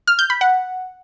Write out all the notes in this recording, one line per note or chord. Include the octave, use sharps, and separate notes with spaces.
F6
G6
B5
F#5